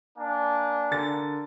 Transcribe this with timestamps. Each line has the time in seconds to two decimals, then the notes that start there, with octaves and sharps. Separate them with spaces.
0.17 A#3 D4 G#5
0.91 D3 A#4 A6